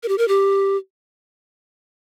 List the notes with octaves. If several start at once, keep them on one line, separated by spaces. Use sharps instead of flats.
A#4
G4
A#4
G4